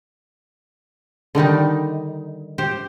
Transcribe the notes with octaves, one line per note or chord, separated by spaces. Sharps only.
D3 D#3 G3 D#4
G4 C5